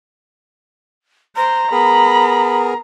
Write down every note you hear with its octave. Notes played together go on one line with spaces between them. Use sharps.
C5 A#5
B3 G#4 A#4 B5